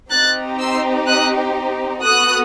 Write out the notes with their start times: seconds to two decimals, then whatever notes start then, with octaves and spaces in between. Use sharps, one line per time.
0.10 C4 D#4 G4 F#6 A6
0.59 C6 E6
1.07 D#6 F#6
2.02 B3 F#4 A4 D#6 F#6